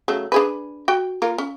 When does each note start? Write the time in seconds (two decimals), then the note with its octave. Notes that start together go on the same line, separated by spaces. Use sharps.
0.08 C#3 F#3 A3
0.32 D4 G#4 B4
0.88 F#4 G5
1.22 A#3 F4 A#4
1.38 C#4